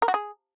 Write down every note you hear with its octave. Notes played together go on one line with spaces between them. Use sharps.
A#4
F#4
G#4